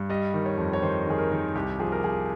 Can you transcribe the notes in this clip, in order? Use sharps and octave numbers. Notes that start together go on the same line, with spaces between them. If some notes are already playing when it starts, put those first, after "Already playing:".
Already playing: G2
G3 D#5
D#3
C#5
F2
C#5
D#3 C5
D#3 G#4
A#4
D#3
C2 G4
F3 G#4
A#4
F3 G#4